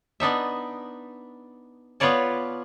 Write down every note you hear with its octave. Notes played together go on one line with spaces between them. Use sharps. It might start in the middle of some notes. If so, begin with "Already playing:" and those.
B3 D4 D#4 E5
B3 F4 B4 C#5 D5 A5